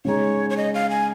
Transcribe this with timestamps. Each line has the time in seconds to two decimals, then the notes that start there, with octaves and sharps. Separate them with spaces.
0.05 C#3 G#3 D#4 G#4 C#5
0.50 C#5
0.57 D#5
0.74 F5
0.90 G#5